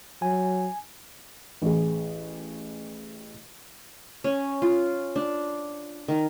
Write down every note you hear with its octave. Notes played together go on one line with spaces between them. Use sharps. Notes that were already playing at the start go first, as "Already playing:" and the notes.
F#3 G#5
A1 G#4
C#4
F4
D4
D#3